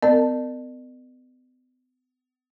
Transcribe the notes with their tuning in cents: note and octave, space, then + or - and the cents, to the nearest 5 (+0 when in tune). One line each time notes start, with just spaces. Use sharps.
B3 +45 A#4 -25 D5 +45